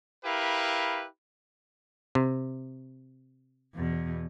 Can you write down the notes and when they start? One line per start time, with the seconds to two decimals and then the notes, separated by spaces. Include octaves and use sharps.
0.25 E4 G4 A#4 B4 F5
2.15 C3
3.75 E2 B2